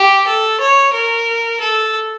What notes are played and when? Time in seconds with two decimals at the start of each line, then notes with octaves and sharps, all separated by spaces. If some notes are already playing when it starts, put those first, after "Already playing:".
Already playing: G4
0.27 A4
0.60 C#5
0.93 A#4
1.60 A4